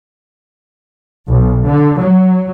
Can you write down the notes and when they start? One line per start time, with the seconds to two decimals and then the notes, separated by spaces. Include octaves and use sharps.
1.28 B1
1.65 D3
1.99 F#3